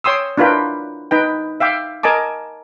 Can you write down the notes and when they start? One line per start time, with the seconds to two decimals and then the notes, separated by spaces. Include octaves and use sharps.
0.04 C#5 G5 C6 D#6 E6
0.38 D4 E4 F4 A#4 B4 G5
1.11 D#4 B4 G5
1.60 E5 F5 G5 D6
2.03 A#4 D#5 G#5 A5 D6